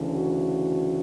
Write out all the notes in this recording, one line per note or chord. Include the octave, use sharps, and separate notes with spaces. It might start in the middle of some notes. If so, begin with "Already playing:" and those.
Already playing: D2 C#3 E3
F#4